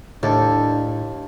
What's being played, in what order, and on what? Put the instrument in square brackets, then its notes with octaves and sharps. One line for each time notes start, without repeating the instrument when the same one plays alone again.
[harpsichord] D#2 [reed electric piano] A2 E4 D6 [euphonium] D4 [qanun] A4